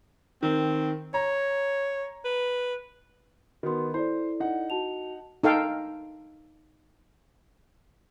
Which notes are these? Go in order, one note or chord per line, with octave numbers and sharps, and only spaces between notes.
D#3 C4
C#5 A#5
B4
D#3 B3 F#4 C6
E4 A4 C5 D5
D#4 F#5
F#4 A5 F7
D#4 A4 F5 G5